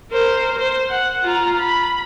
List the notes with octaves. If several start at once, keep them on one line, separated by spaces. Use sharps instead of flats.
A#4 C5
C5
F#5
F4 A#5
B5